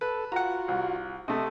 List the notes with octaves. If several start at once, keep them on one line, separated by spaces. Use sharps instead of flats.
A4 B4
F4 F#4 F#5 A#5
C2
C3 A3 D#5